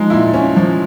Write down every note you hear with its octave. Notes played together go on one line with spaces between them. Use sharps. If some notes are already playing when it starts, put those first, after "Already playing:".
Already playing: F3 G#3 D#4
A#2 E4
C#4
F3